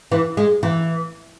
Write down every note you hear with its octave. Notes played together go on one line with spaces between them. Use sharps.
E3
G#3
E3